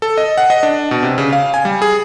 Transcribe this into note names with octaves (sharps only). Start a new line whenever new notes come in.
A4
D#5
F#5
D#5
D4
B2
C3
C#3
F5
G#5
G3
G#4